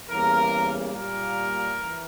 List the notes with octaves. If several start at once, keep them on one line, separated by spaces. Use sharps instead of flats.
E2 C#3 G3 A#3 A#4
A#2 G3 A#3 A#4
E3